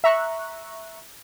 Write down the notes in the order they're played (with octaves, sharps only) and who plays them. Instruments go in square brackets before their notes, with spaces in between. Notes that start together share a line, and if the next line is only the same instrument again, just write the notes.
[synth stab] E5 A#5 C#6 F#6